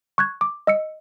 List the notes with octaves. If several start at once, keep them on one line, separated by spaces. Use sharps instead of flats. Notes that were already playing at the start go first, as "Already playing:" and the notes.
C#6 F#6 G#6
D6
D#5 E6 C#7